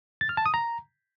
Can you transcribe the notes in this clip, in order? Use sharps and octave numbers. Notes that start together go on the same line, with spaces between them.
A6
F6
A5
D#6
A#5